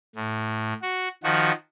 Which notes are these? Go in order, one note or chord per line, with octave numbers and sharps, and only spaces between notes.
A2
F#4
D#3 F3 F#4